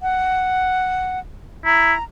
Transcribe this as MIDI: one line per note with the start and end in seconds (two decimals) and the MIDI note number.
0.01 1.19 78
1.65 1.94 64
1.65 2.03 82